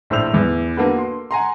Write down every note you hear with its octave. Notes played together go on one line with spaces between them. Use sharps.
A#1 A2 C5 E6 F7
E2 E3
D3 A#3 B3 F#4 A4 B4
C6
F#5 G#5 A#5 C6